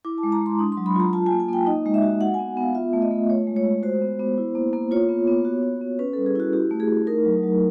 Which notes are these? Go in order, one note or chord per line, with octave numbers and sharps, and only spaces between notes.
E4 D6
A5
G#3
A#5
G#3 C6
D4 D#6
C6
F#3
B5
F4 A#5
F4 A5
G#5
A#3
G#5
A#3 G5
D#4 D#5
G#3
E5
F#4
F#4 F#5
G#5
B3
B3
F5
F4 E5
A3
D#5
A3
F4 C#5
G#3
C#5
G#3
F#4 C5
B3
B3
E4
A#3
A#3
F4 C#5
B3
B3
F#4
B3
B3
C#4 B4
A4
G3
G#4
E4 F#4
F#4 G4
A3
G#4
A3
D#4 A#4
F#3
F#3